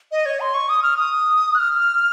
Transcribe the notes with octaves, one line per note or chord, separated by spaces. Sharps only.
D#5
C#5
C6
C#6
D#6
F6
D#6
F#6
F6